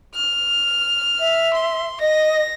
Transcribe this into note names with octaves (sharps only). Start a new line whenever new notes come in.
F6
E5
C6
D#5 A#6